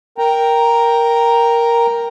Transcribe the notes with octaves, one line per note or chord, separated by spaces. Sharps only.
A#4 G5 A#5